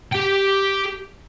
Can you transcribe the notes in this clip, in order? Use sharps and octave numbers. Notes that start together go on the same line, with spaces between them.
G4 G5